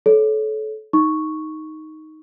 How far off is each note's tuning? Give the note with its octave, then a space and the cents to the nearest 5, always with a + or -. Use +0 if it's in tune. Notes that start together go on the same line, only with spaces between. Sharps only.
A4 -30 C#5 +5
D#4 +5 C#6 +0